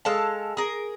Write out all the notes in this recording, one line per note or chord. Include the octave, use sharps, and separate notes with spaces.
G#3 A4 F5 A5
G#4 A#4